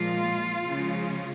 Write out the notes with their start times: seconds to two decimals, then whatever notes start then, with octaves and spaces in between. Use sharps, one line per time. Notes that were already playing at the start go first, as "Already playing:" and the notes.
Already playing: A#2 F3 G#3 F4
0.65 C#3 F3 G#3